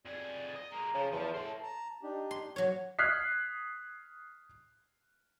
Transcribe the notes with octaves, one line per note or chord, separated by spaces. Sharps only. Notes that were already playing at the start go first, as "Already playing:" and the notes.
F2 G#4 D5
D#5
G#3 A#3 A#5
C#3 F3
E2 F3 A5
A2 C#4 C6
A5 A#5
D4 D#4 G4
C6
F#3 F#4 C#5
D#6 F6 F#6 G#6 B6 C7